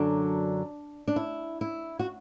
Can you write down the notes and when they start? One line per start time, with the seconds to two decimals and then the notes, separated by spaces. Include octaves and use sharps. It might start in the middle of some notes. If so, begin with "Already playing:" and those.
Already playing: F#2 D3 F#3 D4
1.08 D4
1.16 E4
1.61 E4
1.99 F#4